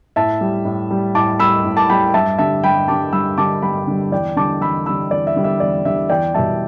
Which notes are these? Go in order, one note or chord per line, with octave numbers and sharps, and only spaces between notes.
A2 E5 A5
G3
A2
G3
A2 A5 D6
G3 B5 E6
A2
A5 D6
G3 G5 B5
G2 E5 A5
D3 G3 E5 A5
G2 G5 B5
D3 G3 A5 D6
G2 B5 E6
D3 G3 A5 D6
G2 G5 B5
D3 G3
E2 D5 G5
D3 G3 A5 D6
E2 B5 E6
D3 G3 B5 E6
E2 D5
E5
D3 G3
E5
E2 D5
D3 G3 E5
E2 D5 G5
B2 G3 E5 A5